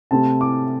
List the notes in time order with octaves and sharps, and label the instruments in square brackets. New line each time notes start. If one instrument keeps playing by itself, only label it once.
[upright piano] C3 A3 C4 A5
D6